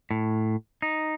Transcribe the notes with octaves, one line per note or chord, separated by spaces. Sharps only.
A2
D#4